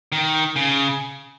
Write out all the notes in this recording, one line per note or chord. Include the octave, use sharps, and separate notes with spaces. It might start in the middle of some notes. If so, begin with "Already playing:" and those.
D#3
C#3